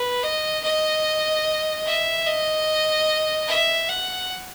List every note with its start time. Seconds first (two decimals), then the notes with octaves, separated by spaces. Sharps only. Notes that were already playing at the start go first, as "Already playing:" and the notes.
Already playing: B4
0.23 D#5
0.64 D#5
1.86 E5
2.27 D#5
3.48 E5
3.89 F#5